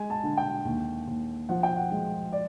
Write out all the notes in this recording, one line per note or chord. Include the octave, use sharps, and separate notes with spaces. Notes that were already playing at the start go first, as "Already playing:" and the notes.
Already playing: G#3 G#5
A5
D3
G5
D#2
D#2
F3 F#5
G5
F#5
G#3
D5